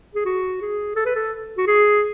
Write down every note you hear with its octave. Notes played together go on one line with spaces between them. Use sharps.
G#4
F#4
G#4
A4
B4
A4
F#4
G#4